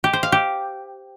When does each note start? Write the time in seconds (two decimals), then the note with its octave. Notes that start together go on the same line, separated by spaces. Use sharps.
0.04 G4
0.13 C5
0.23 F5
0.32 G4